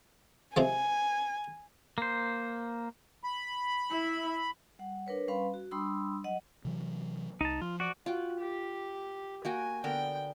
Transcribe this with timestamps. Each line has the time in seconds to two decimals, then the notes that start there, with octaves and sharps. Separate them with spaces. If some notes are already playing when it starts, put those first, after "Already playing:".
0.56 C3 F3 G#3 G#5
1.98 A#3 C5
3.24 B5
3.90 E4 E5
4.79 G3 F#5
5.07 D4 A#4 B4 C#5
5.28 G3 C#4 B4 F5 B5 C6
5.54 F#4
5.71 G3 D4 B5 C6 D#6 E6
6.24 F#3 D#5 F#5
6.65 C3 E3 F#3
7.41 C2 D#4 A5
7.62 F3 F4
7.80 F#4 D5
8.06 F4 F#4 G5
8.40 G4
9.45 A#3 F#4 G5 G#5
9.84 D3 B3 A#4 G5